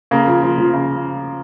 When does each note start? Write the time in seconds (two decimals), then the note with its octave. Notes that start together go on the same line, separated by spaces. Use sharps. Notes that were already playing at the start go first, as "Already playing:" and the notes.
0.11 C#3 A#3
0.27 F3
0.43 F3
0.58 F3
0.73 C#3